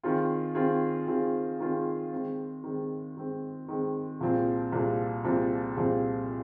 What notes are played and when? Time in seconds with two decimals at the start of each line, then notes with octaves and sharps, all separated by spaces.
0.03 D#3 C4 F4 G#4
0.55 D#3 C4 F4 G#4
1.08 D#3 C4 F4 G#4
1.60 D#3 C4 F4 G#4
2.12 D#3 G#3 C4
2.64 D#3 G#3 C4
3.17 D#3 G#3 C4
3.68 D#3 G#3 C4
4.21 C2 A#2 F3 C4 G#4
4.72 C2 A#2 F3 C4 G#4
5.25 C2 A#2 F3 C4 G#4
5.77 C2 A#2 F3 C4 G#4